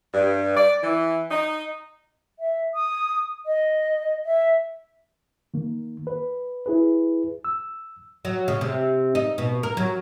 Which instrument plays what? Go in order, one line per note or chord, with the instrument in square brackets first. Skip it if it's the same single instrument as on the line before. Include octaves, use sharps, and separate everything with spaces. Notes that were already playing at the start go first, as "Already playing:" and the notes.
[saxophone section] G2
D5
E3
D#4
[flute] E5
D#6
D#5
E5
[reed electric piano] D#3 A#3
B4
E4 G#4 B4
E6
[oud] F#3
C#3
C3
D#4
B2
A#4
F#3